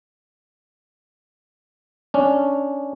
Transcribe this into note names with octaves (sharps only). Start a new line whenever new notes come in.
C#4 D4